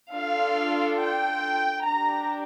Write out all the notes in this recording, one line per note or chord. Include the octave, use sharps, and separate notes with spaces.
D4 F4 A4 F5
G5
D4 G4 A#5